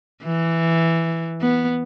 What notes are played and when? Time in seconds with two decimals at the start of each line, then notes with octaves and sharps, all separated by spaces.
0.24 E3
1.42 B3